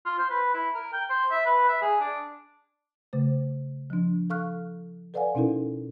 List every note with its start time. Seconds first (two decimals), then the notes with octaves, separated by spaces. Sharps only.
0.05 F4
0.18 C5
0.30 B4
0.54 E4
0.74 A#4
0.92 G5
1.10 C5
1.31 E5
1.46 B4
1.68 E5
1.81 G#4
2.01 D4
3.13 C#3 A3 C5
3.90 F3 D4
4.30 A4 F5 C#6 F6 F#6
5.14 A4 B4 D5 F5 F#5 G#5
5.35 B2 C#4 D#4 E4 A4 A#4